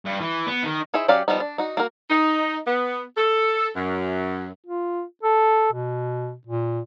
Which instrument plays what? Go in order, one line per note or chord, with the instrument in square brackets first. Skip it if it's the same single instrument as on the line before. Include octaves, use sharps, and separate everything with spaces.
[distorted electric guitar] G2
E3
B3
D#3
[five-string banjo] D#4 E4 G#4 C5 E5
F#3 C#4 G4 D5 F5
F3 G3 B3 D#4
D4
D#4 F#4
A#3 F#4 A#4
[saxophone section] D#4
B3
A4
F#2
[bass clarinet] F4
A4
B2
A#2